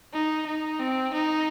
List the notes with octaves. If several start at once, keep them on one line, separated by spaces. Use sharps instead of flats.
D#4
D#4
C4
D#4